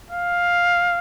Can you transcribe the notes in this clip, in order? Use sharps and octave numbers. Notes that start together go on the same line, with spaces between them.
F5